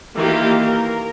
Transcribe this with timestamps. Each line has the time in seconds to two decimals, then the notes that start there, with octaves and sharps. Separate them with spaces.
0.16 D#3 E3 A#3 F4 G4 F5
0.60 A#4